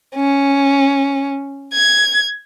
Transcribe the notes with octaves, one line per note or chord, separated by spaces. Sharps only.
C#4
G#6